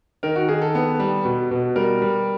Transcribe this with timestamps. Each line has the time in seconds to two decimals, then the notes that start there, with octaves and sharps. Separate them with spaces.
0.23 D#3 A#4
0.36 F#4
0.48 D#3 G#4
0.62 A4
0.75 B3
1.00 G3
1.25 B2
1.51 B2
1.76 G3 A#4
2.02 G3